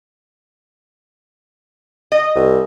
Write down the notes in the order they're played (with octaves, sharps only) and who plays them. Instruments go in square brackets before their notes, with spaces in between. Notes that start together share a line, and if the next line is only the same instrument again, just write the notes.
[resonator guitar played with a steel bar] D#5
[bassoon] C2